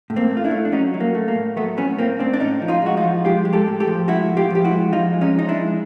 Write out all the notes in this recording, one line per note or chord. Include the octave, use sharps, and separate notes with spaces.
A2
A#3 C4
A3
F4
D4 E4
A3
D4
F#3 C#4 D#4
F#3
A#3
A3
A#3
A2
F#3 A3 B3
A2 B3 C#4
A2 A#3 C4
A2 C4 D4
D4
A2 C#4 D#4
F3
D#4 F4
G#3 F#4
D#4 F4
F3
G#3 F4 G4
G#3
G4 A4
A2
G4 A4
F3
G#3 E4 F#4
A2
F4 G4
F3 G4
E4 F#4
G#3
F3 D#4 F4
G#3
C#4 D#4
F3 D#4
D4 E4
G#3